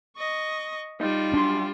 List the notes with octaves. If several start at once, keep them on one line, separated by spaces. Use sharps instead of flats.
D#5 C#6
G3 D#4 F4
F#2 D4 C6